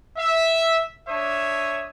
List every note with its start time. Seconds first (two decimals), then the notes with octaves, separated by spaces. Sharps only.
0.17 E5
1.07 D4 C#5 E5 D#6